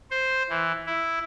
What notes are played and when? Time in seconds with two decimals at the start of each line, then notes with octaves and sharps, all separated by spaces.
0.11 C5
0.50 E3
0.86 E4